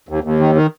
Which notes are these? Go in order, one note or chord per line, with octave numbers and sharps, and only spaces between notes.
D#2
D#2
D#3
D#3